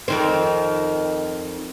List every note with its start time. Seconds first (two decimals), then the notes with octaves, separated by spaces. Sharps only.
0.08 F2 D#3 C4